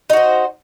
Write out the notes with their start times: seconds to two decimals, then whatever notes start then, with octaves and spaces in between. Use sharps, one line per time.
0.10 D#4
0.13 F#4
0.17 C5